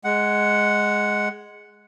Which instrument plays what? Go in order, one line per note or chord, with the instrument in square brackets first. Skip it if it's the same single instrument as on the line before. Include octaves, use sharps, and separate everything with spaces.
[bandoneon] G#3 F#5